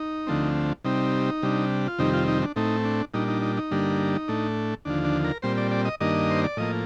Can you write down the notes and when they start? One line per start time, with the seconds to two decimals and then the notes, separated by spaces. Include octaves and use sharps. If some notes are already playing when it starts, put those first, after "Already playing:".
Already playing: D#4
0.27 D2 D3 F3 A3 C4
0.84 C3 G3 C4 D#4
1.43 C3 G3 D4
1.88 F4
1.99 F2 C3 D#3 G3 C4 D#4
2.14 F4
2.28 D#4
2.42 D4
2.56 A2 A3 C4 D#4
2.85 D4
3.14 A#2 G3 D4 D#4
3.28 D#4
3.42 D#4
3.57 D#4
3.71 G2 D3 G3 A#3 D4
4.28 A2 A3 D4
4.85 D#2 D3 F3 D4
5.05 D4
5.24 A#4
5.42 A#2 G3 C4 C5
5.58 D5
5.71 D5
5.85 D#5
6.00 G2 D#3 A#3 D4 D#5
6.30 C5
6.44 D5
6.57 A2 F3 A#3 D#5